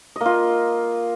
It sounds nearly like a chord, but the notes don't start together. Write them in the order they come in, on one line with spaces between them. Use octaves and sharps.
D#5 A#3 F4